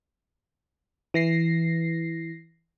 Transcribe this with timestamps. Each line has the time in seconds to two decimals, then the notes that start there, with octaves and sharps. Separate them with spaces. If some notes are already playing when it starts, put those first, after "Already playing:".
1.14 E3 A#6 C7